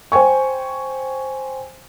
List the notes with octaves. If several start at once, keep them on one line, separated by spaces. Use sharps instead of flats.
C5 G5 G#5 C#6